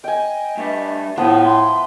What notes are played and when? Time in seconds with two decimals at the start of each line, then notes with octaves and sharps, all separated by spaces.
0.04 D#5 G5 G#5
0.57 G2 A3
1.17 A2 F3 A3 B3 C4 B4
1.45 E5 C6